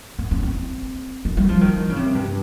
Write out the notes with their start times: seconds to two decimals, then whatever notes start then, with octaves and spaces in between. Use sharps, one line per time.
0.19 C#4
0.31 C#4
0.43 C4
1.25 D#4
1.37 G3
1.49 F3
1.61 D#3
1.90 C#3
1.96 C3
2.15 G2